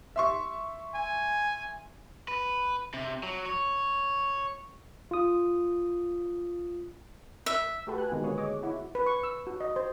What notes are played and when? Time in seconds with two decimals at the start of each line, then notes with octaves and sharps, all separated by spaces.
0.16 E5 C6 C#6
0.94 G#5
2.28 B4
2.94 C3
3.23 F#3
3.46 C#5
5.11 F4 D#6
7.46 E5
7.87 A3 F#4 G4 A4 B4
7.98 G#5 F#6
8.12 G#2 B2 D#3 G#3 A#3
8.24 D3 B3 G#4 C#5
8.38 C#5 D#5 D6
8.63 E4 F#4
8.95 B4
9.06 C#6
9.23 E6
9.47 F#4
9.61 D#5
9.76 C5